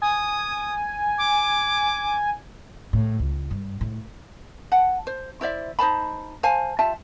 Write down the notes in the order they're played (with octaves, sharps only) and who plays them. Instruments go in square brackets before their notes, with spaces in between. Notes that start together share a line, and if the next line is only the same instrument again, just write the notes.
[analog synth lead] G#5 [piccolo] D#6
[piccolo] D6
[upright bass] A2
C#2
G2
A2
[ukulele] F#5 A5
C5
E4 C5 D5 E5
D#4 C5 A5 B5
C5 F5 G#5 A5
F4 G4 E5 A5